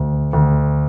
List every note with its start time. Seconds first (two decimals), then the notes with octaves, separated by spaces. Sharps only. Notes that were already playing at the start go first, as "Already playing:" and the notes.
Already playing: D2
0.33 D2